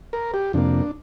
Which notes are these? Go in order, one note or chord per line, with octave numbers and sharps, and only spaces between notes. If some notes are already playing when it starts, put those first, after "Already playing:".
A#4
G4
F2 C3 A#3 D4